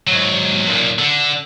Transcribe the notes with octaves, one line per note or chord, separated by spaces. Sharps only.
G#2 F#3
B1 A#2
D3